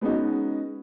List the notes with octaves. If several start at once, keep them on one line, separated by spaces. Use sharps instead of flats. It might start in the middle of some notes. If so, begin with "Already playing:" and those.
G#3 B3 C#4 D#4 F#4